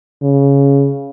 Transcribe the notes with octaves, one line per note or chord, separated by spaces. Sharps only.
C#3